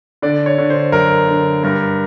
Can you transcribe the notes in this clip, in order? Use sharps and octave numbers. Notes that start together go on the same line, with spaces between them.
D3 D5
C#5
D3
C5
F#2 A#4
D3
G2 A#4